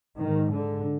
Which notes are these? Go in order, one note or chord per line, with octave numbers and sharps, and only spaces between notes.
G#2 D#3
D3